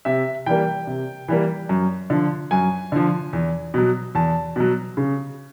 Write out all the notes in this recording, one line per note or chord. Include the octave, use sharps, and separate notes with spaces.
C3 E5
E3 G3 A#3 G5
C3
E3 G3 A#3
F#2
D3 F3
F#2 G#5
D3 F3
E2
B2 F#3
E2 A5
B2 F#3
C#3